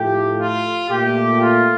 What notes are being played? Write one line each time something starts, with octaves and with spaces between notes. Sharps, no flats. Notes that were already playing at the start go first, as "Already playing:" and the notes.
Already playing: A2 F3 A3 G4
F4
A#2 A3 G4
F4